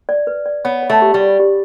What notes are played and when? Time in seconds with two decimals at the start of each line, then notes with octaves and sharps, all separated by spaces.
0.09 D5
0.27 B4
0.46 D5
0.65 B3 C#5
0.83 C#5
0.90 A3
1.02 G4
1.14 G3
1.20 G4
1.40 G4